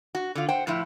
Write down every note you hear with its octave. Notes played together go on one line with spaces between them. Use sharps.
F#4
D3 F4
C5 F#5 G5
A2 F3 E4